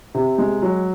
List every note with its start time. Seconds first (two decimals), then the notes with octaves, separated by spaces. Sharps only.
0.14 C3
0.38 G#3
0.62 F#3